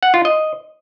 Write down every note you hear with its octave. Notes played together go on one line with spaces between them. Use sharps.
F#5
F4
D#5